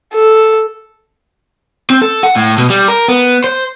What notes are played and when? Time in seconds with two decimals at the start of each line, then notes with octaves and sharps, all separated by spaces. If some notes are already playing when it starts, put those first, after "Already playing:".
0.14 A4
1.90 C4
2.02 A4
2.23 F#5
2.36 A2
2.58 B2
2.70 G3
2.88 A#4
3.08 B3
3.44 C5